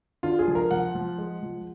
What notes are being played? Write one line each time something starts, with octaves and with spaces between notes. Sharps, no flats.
D3 F4
G#4
F3
A#4
F3 F#5
F3
G#3
F3